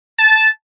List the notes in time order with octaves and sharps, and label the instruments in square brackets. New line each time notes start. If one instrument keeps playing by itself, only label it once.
[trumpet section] A5